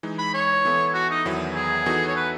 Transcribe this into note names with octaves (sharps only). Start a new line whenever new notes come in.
E3 G#3 D#4
B5
C#5
E3 B3 E4 A4
F#4
D#4
E2 D#3 F#3 B3 E4
G#4
E3 B3 D#4 F#4 A4
C#5
B4